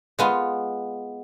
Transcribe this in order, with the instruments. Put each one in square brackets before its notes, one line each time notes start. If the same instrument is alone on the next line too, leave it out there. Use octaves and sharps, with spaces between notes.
[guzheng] G#3 B3 F4